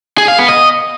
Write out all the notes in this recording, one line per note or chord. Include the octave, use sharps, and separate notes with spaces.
G#4
F5
B3
D#5